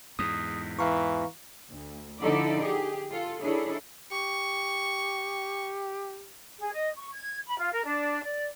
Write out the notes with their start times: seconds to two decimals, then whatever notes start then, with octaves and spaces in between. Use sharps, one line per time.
0.19 E2 G#2 D#6
0.79 E3 F5 A#5 C#6
1.69 D2
2.21 D3 F3 D#4 E4 A4 D5
2.63 G4 G#4
3.13 F4 A4
3.41 D#3 D4 E4 G#4 A4 C#5
4.11 G4 C#6
6.58 G#4
6.73 D#5
6.96 C#6
7.13 G#6
7.46 B5
7.57 F4
7.72 A#4
7.84 D4
8.22 D5